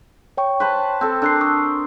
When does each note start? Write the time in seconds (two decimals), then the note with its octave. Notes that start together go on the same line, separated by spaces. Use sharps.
0.37 C#5 G5 C#6
0.60 B4 C5 A5
1.01 C4 A4
1.22 D4 A#4 C6 E6 F#6 C7
1.41 C#6 D#6 E6